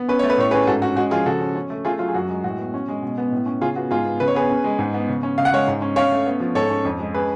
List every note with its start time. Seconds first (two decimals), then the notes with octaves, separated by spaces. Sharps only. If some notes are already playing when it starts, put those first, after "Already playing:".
Already playing: B3
0.09 C#4 B4
0.19 A3 C#5
0.30 B4
0.38 A2 C#5
0.51 C#4 G#4 B4
0.67 G#2 F#4 A4
0.82 C#4 F#4
0.96 G#3 F#4
1.11 F3 F4 G#4
1.26 C#3 F#4 A4
1.41 C#4
1.55 C#4
1.70 A3
1.85 A3 F4 G#4
1.99 F#3 F4
2.08 G#4
2.14 F#2 F#4
2.29 G#3
2.44 A2 F#4
2.58 B3
2.74 C#4
2.88 G#3
3.02 B2
3.18 B3
3.32 A2
3.46 C#4
3.61 C#3 F4 G#4
3.76 B3 F#4
3.91 G#2 F4 G#4
4.05 B3
4.20 C#3 B4
4.28 C#5
4.35 B3 G#4 B4
4.50 C#4
4.64 G#3
4.79 G#2
4.94 B3
5.08 C#3
5.23 C#4
5.38 C#3 F5
5.45 F#5
5.53 G#3 C#5 F5
5.67 G#2
5.82 C#4
5.96 C#4 C#5 F5
6.12 A3
6.26 B3
6.40 F3
6.55 G#2 A4 C#5
6.70 C#4
6.85 F2
6.99 G#3
7.14 C#4 G#4 B4